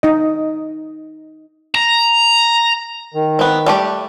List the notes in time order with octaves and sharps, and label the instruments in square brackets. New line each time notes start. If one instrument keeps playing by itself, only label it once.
[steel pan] D#4 D#5
[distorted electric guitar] A#5
[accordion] D#3
[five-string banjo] B3 C4
G3 A3 G4